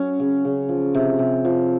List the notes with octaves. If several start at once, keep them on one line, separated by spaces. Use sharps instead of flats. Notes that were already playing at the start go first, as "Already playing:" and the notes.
Already playing: F#3 C#4
C#3
C#3
F3
C3
C3
F3